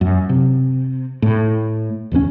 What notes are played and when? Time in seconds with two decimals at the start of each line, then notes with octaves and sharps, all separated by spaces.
0.01 F#2
0.29 C3
1.22 A2
2.12 D1 E2 E3 C#4